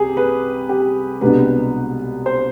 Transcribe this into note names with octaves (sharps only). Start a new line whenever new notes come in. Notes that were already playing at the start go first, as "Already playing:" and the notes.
Already playing: C2 C3 G4 G#4
B4
G4
C2 B2 G#3 B3 D4 B4
C5